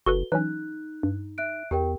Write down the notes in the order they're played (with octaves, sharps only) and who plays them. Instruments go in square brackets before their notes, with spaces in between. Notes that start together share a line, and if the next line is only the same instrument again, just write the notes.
[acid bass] F#1 [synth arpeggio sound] F#4 A4 B4 [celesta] G7
[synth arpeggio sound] E3 F#3 C#4 [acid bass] D#4 [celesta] F#6
[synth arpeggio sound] G2
[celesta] E5 F#6 D7
[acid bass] E2 [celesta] G4 A#4 G5